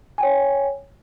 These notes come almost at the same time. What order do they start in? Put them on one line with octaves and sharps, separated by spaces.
G#5 G5 C#5